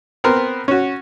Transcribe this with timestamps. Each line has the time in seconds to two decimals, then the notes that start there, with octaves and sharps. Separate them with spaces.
0.24 B3 C4 A#4
0.68 C#4 F#4